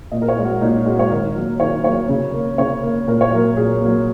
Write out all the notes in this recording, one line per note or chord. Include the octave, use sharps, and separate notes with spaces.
A#2 D#5
A#4
C#5
G#3
F#4
A#2 D#4
G#3 F#4
C#5
D#3 A#4
F#3 A#3
D#3 C#5
F#3 A#3 C#5
C#3
A#3
C#3 C#5
A#3
A#2 A#4
C#5
F#3 A#3 A#4
A#2 G#4
F#3 A#3